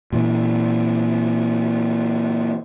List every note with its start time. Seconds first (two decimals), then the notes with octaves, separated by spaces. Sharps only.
0.13 A#2 E3